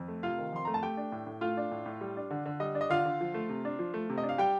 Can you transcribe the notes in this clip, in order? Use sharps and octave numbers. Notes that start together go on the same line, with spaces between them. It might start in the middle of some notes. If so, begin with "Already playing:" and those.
Already playing: F2
A3
C3 F4 F5
D#3
F2 C6
A3 A#5
A5
A3 G4 G5
D4
A2
A2
A3 F4 F5
D4
A2
A2
G3
D4
D3
D3
G3 D#5
D4
D#5
D3 F4 F5
D3
F3
A3
C3
D4
F3
A3
C3
D#5
D4
F5
G3 G4 G5